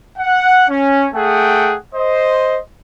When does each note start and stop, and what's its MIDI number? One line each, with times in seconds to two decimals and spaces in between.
0.18 0.65 78
0.69 1.07 61
1.14 1.77 57
1.14 1.77 68
1.14 1.77 78
1.14 1.77 79
1.95 2.59 72
1.95 2.59 75